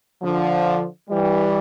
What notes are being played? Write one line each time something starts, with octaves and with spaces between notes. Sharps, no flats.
D3 F3
E3 G3